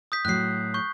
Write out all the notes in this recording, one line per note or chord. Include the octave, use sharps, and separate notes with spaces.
D#6 G6 B6
A2 F#3 F#6 C7
C#6 G6